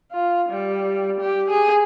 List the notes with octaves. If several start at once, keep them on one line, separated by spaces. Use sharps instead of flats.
F4
G3
G4
G#4